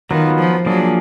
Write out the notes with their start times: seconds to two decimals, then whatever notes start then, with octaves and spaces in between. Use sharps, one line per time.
0.11 D#3 F#3 B3 F4
0.39 F3
0.66 F3 F#3 A#3 D4 G#4